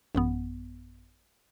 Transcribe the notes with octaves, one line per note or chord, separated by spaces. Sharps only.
A1 F#2 B3